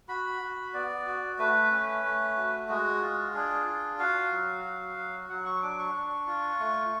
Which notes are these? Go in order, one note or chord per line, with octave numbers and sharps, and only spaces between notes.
F#4 B5
F#4
B3 D5
F#4
A3 B4
C#4
A3
F#4
G#3 F#4
F4
D4 G#4
F4
F#4 F5
F#3
F#4
F#3
F#3 F#5
C#6
D4 D6
C#6
D4
F4
A3